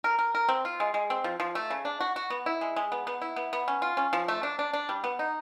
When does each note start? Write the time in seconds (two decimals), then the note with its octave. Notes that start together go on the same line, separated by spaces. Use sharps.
0.04 A#4
0.19 A#4
0.35 A#4
0.49 C4
0.65 F4
0.80 G#3
0.94 G#3
1.10 C4
1.24 F3
1.40 F3
1.55 A3
1.70 C#3
1.85 D4
2.01 F#4
2.16 F#4
2.30 B3
2.46 E4
2.61 G#3
2.76 G#3
2.92 B3
3.07 B3
3.22 E4
3.36 B3
3.53 B3
3.68 C#4
3.82 F4
3.97 C#4
4.13 F3
4.28 A3
4.43 D4
4.59 D4
4.73 D4
4.89 G3
5.04 B3
5.19 D#4